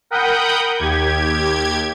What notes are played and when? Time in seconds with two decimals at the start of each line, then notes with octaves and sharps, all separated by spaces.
0.11 A#4 F#5 G5 B5 D#6 G6
0.78 D#2 G4 G#6